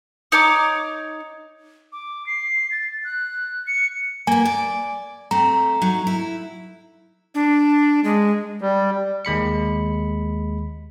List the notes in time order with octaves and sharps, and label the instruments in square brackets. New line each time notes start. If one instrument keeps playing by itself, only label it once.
[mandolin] D#4 C#5 A#5 D6
[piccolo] D6
C7
A6
F#6
C#7
[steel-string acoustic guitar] A#3 B3 [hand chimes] G#5
[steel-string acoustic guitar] D5
[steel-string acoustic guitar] A3 C4 [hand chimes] A#5
[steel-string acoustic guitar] F#3 D#4
E4
[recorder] D4
G#3
[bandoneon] G3
[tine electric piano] D#2 G#3 B5 C#7